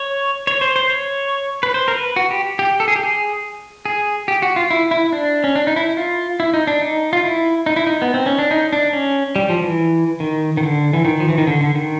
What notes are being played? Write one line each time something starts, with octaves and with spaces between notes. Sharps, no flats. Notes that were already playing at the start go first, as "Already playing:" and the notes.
Already playing: C#5
C#5
C5
C5
C#5
B4
C5
A#4
B4
F#4
G4
G4
A4
G#4
G4
G#4
G#4
G4
F#4
F4
E4
E4
D4
C#4
D4
D#4
E4
F4
E4
D#4
D4
D#4
F4
E4
D#4
E4
D#4
B3
C4
C#4
D4
D#4
D4
C#4
G3
F3
E3
D#3
D#3
D3
E3
D#3
F3
E3
D#3
D3
D3
D#3